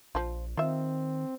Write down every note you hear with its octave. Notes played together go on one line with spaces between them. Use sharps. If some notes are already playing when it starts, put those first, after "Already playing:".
A#1 F3 F4
D#3 C4 F4 E5